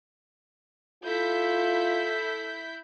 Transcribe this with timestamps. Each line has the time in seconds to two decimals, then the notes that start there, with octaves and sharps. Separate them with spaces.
1.04 E4 F4 A4 G6 B6